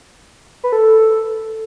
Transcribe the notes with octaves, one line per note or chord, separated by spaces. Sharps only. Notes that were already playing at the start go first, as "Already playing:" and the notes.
B4
A4